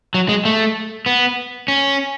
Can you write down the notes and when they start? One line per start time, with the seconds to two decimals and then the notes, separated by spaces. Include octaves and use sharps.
0.14 F#3
0.29 G#3
0.45 A3
1.06 B3
1.68 C#4